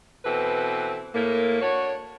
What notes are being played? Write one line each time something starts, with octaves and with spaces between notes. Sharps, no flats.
B2 E3 C4 A4 B4
A2 A#3
D4 F#4 C#5